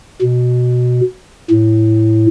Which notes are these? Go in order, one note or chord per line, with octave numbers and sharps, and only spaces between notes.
B2
A2